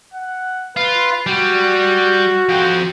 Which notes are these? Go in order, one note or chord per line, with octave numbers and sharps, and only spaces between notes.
F#5
F4 B4
G3 F#4
F3 G5